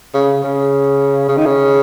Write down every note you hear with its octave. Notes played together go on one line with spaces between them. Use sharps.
C#3
C#3
C#3
D#3
C#3